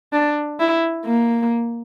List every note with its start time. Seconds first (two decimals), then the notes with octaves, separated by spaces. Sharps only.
0.13 D4
0.59 E4
1.05 A#3